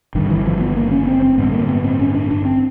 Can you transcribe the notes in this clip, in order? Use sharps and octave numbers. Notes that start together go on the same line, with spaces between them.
G#1 G2 D3 D#3
E3
F3
B3
A#3
C#4
C4
C4
A1 G2 D3 B3
A#3
B3
C4
C#4
D4
D4
C4